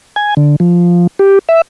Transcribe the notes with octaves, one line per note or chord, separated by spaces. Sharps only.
G#5
D3
F3
G4
E5